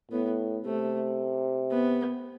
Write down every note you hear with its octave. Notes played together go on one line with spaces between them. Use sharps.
A2 B3
C3 A3
B3